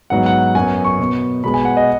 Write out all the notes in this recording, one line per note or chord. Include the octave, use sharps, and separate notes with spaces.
G#2 F#3 B3 F#5
F#5
F#2 F#3 B3 G#5
C#6
B2 B3
B2 G#3 B3 B5
G#5
F#5
D#5